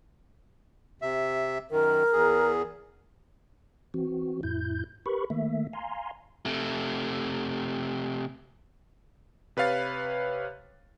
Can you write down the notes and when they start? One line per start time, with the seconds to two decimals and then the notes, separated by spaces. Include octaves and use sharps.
1.02 C3 E5
1.71 F#2 D#3 A#4
2.13 E2 G#4
3.94 E3 C4 F#4
4.43 F2 A2 E4 G6
5.06 G4 A#4 B4 B5 C#6
5.30 D#3 A3 A#3 E5
5.73 F5 G#5 A#5 C6
6.46 C3 A3
9.57 C3 B4 C#5 F5 A6